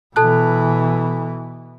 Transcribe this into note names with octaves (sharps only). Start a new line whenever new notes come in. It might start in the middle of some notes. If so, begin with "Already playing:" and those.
B2 E3 A4 A5 F#6